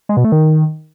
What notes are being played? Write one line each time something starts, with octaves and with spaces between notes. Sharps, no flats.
G#3
B2
A3
D#3